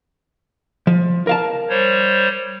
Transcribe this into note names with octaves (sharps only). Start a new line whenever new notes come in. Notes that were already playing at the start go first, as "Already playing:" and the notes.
F3
A#4 F5 A5
G3 C5 C#5